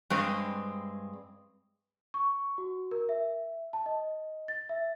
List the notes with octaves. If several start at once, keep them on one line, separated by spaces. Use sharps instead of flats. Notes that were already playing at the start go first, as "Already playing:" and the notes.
G2 G#3 C4
C#6
F#4
A#4
E5
A5
D#5
A6
E5